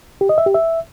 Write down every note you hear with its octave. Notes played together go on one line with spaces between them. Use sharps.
G4
D#5
E5
G4
E5